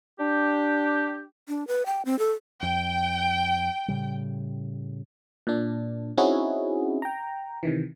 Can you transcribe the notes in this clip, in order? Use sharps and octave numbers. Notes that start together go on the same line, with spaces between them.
D4 G4
D4
B4
G5
C4
A4
F2 G5
A2 C#3 G3
A#2 D4
C4 C#4 D#4 E4 F#4 G#4
G5 A#5
C3 D#3 E3